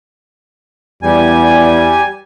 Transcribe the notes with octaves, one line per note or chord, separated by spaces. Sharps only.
E2 G3 G#5